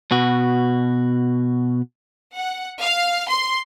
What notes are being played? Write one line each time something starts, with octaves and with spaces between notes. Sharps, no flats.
B2 F#4
F#5
F5
C6